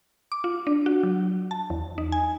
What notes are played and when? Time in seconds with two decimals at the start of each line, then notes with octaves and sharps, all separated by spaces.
0.32 D6
0.44 F4
0.67 D4
0.86 F#4
1.03 F#3
1.51 A5
1.70 E2
1.98 D#4
2.12 G#5